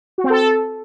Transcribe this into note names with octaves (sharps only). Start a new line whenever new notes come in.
F#4
C4
A4